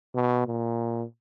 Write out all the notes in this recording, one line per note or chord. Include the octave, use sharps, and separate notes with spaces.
B2
A#2